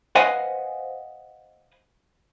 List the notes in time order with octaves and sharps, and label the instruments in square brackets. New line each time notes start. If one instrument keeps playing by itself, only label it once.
[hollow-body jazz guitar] B4 C5 D#5 F5 F#5 G#5